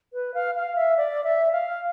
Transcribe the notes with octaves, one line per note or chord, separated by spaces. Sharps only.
B4
F5
F5
E5
D5
E5
F5